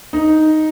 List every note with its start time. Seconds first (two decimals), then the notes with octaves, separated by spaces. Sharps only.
0.13 D#4